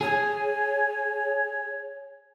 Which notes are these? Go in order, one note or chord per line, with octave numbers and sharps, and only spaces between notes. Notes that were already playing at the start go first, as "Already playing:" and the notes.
G#4 C#5